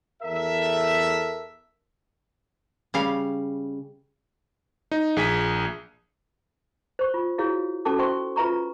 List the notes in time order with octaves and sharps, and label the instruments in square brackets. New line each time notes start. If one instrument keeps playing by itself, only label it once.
[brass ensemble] E2 A4 A#4 E5
[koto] C#3 G3 F5
[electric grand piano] D#4
A#1 G#4 G#5 B6
[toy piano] C5 C#6
F4
E4 F#4 G#4 C#5 F5
C#4 F#4 A4 A5 D6
C5 E5 G5 C6 C#6
F4 B4 E5 A#5 C#6